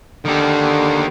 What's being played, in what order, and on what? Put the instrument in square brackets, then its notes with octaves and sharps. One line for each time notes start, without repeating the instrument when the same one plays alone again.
[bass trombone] D3 [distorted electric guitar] D#3 G4